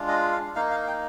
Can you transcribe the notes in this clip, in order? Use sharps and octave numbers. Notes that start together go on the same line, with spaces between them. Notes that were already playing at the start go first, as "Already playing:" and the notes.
Already playing: G#3 D4 F4
D#5
F5
A#3 D#4 F5
F5
G5